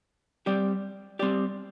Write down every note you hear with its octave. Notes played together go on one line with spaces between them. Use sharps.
G3 C4 G4 D5
G3 C4 G4 D5